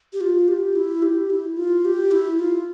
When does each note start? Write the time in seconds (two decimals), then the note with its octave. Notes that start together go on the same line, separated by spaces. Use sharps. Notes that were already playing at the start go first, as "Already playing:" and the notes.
0.13 G4
0.21 F4
0.48 G4
0.76 E4
1.02 G4
1.30 E4
1.57 F4
1.85 G4
2.11 E4
2.39 F4